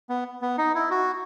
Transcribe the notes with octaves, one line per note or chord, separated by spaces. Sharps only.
B3
B3
D#4
E4
F#4